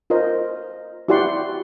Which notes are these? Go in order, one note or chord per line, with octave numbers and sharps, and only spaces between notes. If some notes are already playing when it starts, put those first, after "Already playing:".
F4 A#4 C5 D#5
E4 F#4 G4 D5 F#5 C6